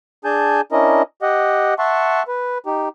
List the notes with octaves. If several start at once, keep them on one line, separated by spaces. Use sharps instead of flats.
D4 G#4 G#5 A5 G6
C#4 D4 E4 A#4 D#5
G4 D#5 F#5
E5 F#5 A5 C6 C#6
B4
D#4 G4